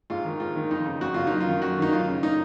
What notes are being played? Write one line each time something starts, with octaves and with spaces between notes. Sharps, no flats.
G#2 F4
D#3
G#2 F4
D#3
F2 D#4
C#3
F2 F#4
C#3 F4
F#2 D#4
F4
D#3
F#2 F#4
D#3 D#4
F#2 F4
C#3
D#4